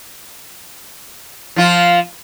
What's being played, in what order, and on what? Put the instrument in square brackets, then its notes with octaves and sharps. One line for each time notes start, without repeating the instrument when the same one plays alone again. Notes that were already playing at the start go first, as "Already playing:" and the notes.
[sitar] F3 F4